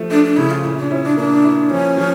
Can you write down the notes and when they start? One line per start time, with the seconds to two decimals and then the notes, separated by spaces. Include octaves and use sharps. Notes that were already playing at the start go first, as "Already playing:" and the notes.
Already playing: F3 A3
0.10 A3 D4
0.24 D4
0.37 C#3 E4
0.51 F4
0.64 A#2 E4
0.78 D4
0.91 C#4 E4
1.04 D4
1.17 A#3 D4
1.44 E4
1.70 F3 C#4
1.97 F3